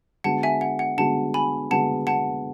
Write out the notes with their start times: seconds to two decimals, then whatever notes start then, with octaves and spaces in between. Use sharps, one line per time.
0.24 D3 G#3 B3 F#4 F#5 A5
0.43 E5 G#5
0.61 F#5
0.79 F#5
0.98 D3 G#3 B3 F#4 F#5 A5
1.34 G#5 B5
1.71 D3 G#3 B3 F#4 F#5 A5
2.07 F#5 A5